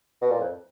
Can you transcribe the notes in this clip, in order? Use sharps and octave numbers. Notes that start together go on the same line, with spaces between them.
B2
A#2
F2